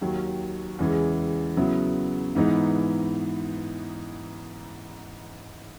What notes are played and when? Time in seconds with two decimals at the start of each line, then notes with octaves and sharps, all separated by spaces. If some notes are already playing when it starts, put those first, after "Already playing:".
0.01 D#2 D#3 F#3
0.79 E2 C#3 E3 G#3
1.57 C#3 F#3 B3 E4
2.35 G#2 E3 B3 D#4